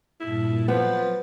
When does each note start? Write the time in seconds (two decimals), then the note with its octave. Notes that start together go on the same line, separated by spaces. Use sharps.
0.20 G2 A#2 E4 A5
0.68 F3 F#3 B3 B4 A6